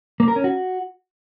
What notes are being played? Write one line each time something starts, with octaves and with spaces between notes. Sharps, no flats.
A#3
A#4
C#4
F#4